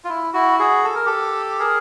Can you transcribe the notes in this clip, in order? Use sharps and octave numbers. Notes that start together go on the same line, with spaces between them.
F4
E4
E4 F#4
F#4 G#4
A4
A#4
G4 A4
G#4 A#4